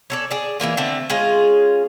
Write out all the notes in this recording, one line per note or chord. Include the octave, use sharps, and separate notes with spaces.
C#4 A4 D5
G#4 D5
E3 F#3 A#3 F4
D3 A3 C4 A5
G#3 C#4 F4 G#4